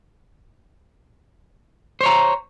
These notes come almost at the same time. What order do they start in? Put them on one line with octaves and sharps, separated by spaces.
C5 C#5 A#5